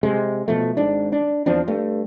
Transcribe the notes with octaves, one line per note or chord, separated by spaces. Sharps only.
C3 G#3
B2 F3 A3
G#1 G#2 D4
D4
E2 F3 C4 D4
G2 A3